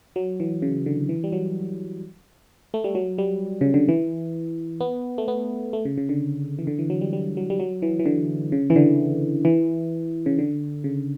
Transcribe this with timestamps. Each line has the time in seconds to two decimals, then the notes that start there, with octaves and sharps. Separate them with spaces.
0.16 F#3
0.40 E3
0.62 C#3
0.86 D3
1.09 E3
1.24 G3
1.32 F#3
2.74 A3
2.84 G3
2.95 F#3
3.18 G3
3.61 C#3
3.74 D3
3.89 E3
4.81 B3
5.18 A3
5.28 B3
5.73 A3
5.85 C#3
5.97 C#3
6.09 D3
6.59 E3
6.67 D3
6.79 E3
6.90 F#3
7.01 G3
7.13 G3
7.37 F#3
7.50 G3
7.60 F#3
7.82 E3
7.99 E3
8.06 D3
8.52 C#3
8.70 E3
8.76 D3
9.45 E3
10.26 C#3
10.39 D3
10.84 C#3